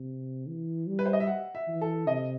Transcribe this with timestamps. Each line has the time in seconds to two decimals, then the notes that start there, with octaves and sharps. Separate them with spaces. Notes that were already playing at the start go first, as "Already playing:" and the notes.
Already playing: C3
0.47 E3
0.87 G3
0.99 B4
1.06 C5
1.13 D#5
1.20 E5
1.27 F#5
1.55 E5
1.68 E3
1.81 A4
2.07 C3 D#5